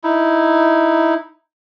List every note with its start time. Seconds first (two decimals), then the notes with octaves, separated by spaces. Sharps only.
0.04 D#4 E4